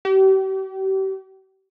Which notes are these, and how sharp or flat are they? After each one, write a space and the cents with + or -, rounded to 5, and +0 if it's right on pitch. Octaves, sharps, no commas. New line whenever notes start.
G4 -40